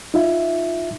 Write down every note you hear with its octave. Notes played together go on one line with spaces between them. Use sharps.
D#4 F4 E5